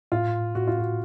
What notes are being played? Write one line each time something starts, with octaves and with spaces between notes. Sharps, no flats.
A2 F4
A2 F#4
F4
F#4